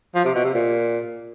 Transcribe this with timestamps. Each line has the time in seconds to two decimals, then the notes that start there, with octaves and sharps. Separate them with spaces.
0.15 F3
0.25 C3
0.35 B2
0.44 C3
0.54 A#2